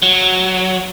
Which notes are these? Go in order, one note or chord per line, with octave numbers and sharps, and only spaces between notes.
F#3